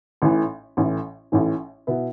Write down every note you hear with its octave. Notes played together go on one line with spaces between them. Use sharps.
A1 A2 E3
A1 A2 E3
A1 A2 E3
B2 B3 E4